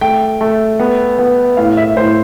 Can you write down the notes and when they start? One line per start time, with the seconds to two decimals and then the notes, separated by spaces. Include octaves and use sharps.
0.01 A3 G5
0.41 A3
0.80 B3
1.19 B3
1.57 A2 F5
1.77 E5
1.96 A2 C5